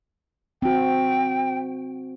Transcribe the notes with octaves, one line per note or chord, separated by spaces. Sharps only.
C4 F#4 G5